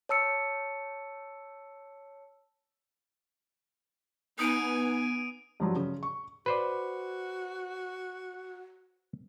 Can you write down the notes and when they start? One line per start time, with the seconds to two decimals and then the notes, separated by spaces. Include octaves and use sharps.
0.09 C#5 A5 E6 C#7
4.39 B3 D#4 G#5 D#6 D7 D#7
5.60 G2 F3 F#3
5.76 C#3
6.03 C#6
6.46 F#4 B4 C5 D5